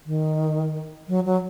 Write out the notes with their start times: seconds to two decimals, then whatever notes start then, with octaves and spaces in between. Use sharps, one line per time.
0.06 D#3
1.08 F#3
1.25 F#3